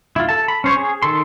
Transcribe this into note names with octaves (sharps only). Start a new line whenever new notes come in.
E4 F4
A4 A5
B5
C#4 C5 C#5
G#4
D#3 A4 C6